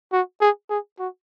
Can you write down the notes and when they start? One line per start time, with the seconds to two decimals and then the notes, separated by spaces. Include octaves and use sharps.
0.13 F#4
0.41 G#4
0.70 G#4
0.99 F#4